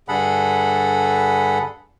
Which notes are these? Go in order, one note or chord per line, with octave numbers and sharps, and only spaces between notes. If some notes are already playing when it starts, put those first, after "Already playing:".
G2 D3 G#4 A4 F#5 B5